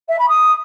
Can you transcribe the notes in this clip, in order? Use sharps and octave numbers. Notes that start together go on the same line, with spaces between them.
E5
B5
D#6